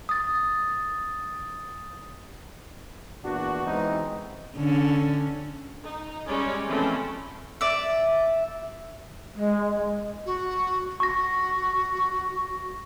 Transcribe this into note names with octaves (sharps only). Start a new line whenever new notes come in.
D#6 A6
E2 A#2 D4 F#4
E3 G#3 B3 C4 D#4
D3 C#4
D#4
G3 G#3 C#4 C#5 D5
E3 F3 A3 C4 C#4
D5 E5
G#3
F#4
F#4 C#6 A#6